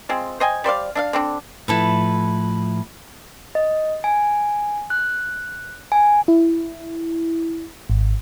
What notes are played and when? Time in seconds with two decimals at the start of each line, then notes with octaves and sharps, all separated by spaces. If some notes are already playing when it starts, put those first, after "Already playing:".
0.09 G#3 C4 F4
0.40 C5 D#5 G5 G#5
0.64 G3 C5 D5 F5
0.95 D4 E5 F5
1.13 D3 C4 D4
1.68 A2 F3 E4 A4 B4
3.55 D#5
4.04 G#5
4.90 F#6
5.92 G#5
6.28 E4
7.90 G#1